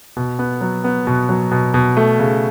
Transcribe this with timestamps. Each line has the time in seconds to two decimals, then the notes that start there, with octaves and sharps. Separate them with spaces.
0.17 B2
0.39 B3
0.61 F#3
0.84 B3
1.07 B2
1.29 F#3
1.51 B2
1.74 B2
1.97 A3
2.19 C#3